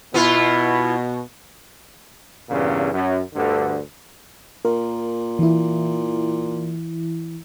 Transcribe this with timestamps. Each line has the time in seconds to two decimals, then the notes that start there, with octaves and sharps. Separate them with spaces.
0.14 B2 B3 E4 F4
2.49 E2 G2 A#2 C#3
2.92 F#2
3.34 D2 G2 D3
4.65 A#2 A#4
5.39 E3 E4